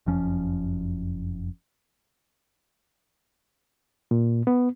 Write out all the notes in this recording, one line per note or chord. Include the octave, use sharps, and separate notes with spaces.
F#1 F2 F3 C#4
A#2
B3